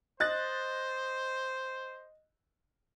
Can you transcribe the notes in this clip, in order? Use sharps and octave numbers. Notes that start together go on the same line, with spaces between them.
C5 D#5 F#6 A6